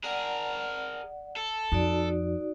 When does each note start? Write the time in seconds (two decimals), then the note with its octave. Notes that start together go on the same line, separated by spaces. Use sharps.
0.04 G#4 A#4 D5 F#5
1.36 A4
1.72 F2 D#4 F#4 D5